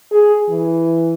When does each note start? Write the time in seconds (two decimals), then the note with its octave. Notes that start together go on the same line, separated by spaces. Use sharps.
0.11 G#4
0.49 E3